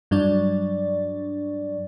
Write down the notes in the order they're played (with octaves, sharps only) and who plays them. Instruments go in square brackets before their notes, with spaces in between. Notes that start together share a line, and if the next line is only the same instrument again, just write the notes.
[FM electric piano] G2 F#3 D4 D5